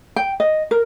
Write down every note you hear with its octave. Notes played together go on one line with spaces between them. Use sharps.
G5
D#5
A#4